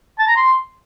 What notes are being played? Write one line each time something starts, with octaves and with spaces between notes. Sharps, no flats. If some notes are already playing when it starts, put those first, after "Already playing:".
A5
A#5
C6